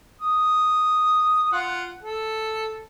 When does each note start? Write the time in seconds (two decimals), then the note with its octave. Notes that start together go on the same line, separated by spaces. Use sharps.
0.21 D#6
1.53 F4 F#5
2.03 A4